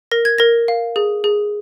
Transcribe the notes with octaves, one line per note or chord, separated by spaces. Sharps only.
A#4 A#6
G#6
A#4 A#6
F5
G#4
G#4